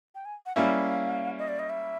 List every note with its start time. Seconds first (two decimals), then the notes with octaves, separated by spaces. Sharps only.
0.15 G5
0.25 G#5
0.46 F#5
0.56 G3 A#3 C#4 E4 F5
1.39 D#5
1.48 D5
1.59 D#5
1.70 E5